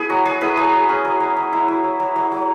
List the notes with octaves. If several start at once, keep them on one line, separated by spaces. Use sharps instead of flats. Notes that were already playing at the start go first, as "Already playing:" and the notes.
Already playing: B3 E4 G#4 B4
F#3 F#4
F#3 G#4
B3 E4 B4
F#3 G#4
F#3
C#4
F#3
F#3
F#3
E4
F#3
F#3
F#3
F#3
F#3